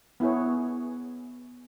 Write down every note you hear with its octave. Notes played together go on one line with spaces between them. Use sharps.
B3 E4 G#4 C#5